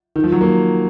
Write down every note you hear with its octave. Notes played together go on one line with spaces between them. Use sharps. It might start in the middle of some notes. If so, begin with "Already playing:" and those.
D#3
F3
F#3
A#3